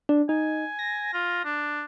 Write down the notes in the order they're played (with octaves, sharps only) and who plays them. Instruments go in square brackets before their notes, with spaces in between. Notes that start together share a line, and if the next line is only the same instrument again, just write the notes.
[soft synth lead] D4
[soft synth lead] D#4 [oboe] G#5
[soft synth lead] A#6
[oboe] F4
D4